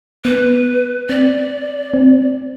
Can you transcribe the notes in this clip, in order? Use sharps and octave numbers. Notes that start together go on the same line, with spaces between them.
B3 B4
C4 D5
C4